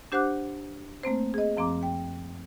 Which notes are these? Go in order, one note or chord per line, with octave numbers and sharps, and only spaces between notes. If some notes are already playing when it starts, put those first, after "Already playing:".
D4 G4 C5 F#5 D6 F#6
A3 A#3 C4 C5
G#4 D#5
F#2 F3 C4 A#5 D6
G5